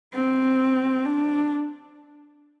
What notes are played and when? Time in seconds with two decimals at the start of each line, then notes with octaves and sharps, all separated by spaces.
0.14 C4
1.05 D4